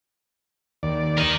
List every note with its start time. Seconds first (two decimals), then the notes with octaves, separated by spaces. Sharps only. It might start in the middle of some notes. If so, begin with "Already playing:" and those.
0.83 D#2 D5
1.17 A#4 D#5